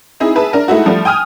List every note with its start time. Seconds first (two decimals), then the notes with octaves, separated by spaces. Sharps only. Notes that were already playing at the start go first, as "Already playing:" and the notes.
0.20 C4 D#4 E4 G#4
0.35 G#4 B4 E5 A5
0.53 D4 A#4
0.68 G#3 A3 D#4 E4 F#4
0.86 F3 G3 A3
1.05 G5 G#5 D#6 F6